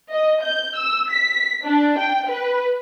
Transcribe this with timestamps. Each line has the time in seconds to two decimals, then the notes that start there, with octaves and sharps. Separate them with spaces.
0.11 D#5
0.43 G6
0.76 E6
1.11 B6
1.65 D4
1.99 G5
2.28 B4